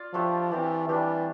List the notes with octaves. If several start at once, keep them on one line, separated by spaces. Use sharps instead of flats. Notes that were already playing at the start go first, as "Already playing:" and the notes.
Already playing: F4 D5
F3 A3 D4 G4 C5
E3 C4 G4 D5
E3 G3 D4 G4